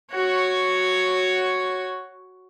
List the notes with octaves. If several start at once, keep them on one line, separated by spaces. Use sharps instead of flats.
F#4 C#5